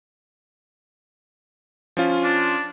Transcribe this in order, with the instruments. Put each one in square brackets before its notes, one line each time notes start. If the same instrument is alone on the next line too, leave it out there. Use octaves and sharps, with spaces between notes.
[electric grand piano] F3 C#4 F4
[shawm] D4